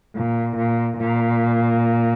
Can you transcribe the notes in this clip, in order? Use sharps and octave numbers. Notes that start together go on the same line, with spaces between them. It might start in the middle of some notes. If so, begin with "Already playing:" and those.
A#2
A#2
A#2